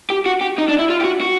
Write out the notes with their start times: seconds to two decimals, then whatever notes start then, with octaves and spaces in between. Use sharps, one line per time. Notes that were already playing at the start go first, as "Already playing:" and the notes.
0.10 G4
0.26 F#4
0.41 G4
0.58 D#4
0.68 D4
0.79 E4
0.90 F4
1.01 G4
1.04 F#4
1.21 F#4